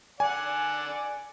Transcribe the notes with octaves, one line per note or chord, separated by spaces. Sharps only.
D5 F#5 G#5